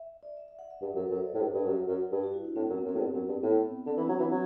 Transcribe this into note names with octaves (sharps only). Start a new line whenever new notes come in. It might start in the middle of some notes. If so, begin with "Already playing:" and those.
Already playing: E5
D5
E5
E5
F#5
E5
G2
F#2 A4
B4
F#2
C5
D5
A2
G2
G2
F#2
F#2
G2 B4
F#4
E4
D4
A2 C4
C4
F#2
B3
F#2
C4
A2
G2 B3
F#2 C4
G2
A2 B3
C4
D3 C4
E3 D4
F#3 D4
E3 C4
F#3